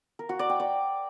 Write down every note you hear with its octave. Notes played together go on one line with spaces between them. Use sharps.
A#4
F#4
D5
G5
D5